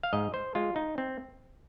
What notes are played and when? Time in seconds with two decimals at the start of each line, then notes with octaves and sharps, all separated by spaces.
0.03 F5
0.13 G#2 D#5
0.34 C5
0.55 G#3 F4
0.76 D#4
0.98 C4